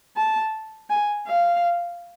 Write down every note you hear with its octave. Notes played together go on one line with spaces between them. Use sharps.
A5
G#5
F5